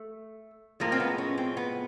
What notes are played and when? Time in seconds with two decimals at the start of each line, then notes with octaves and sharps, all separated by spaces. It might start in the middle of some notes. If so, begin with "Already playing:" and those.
Already playing: A3
0.80 A2 F3 G#3 A#3
0.92 C4
1.00 B3
1.18 C#4
1.38 C4
1.57 B3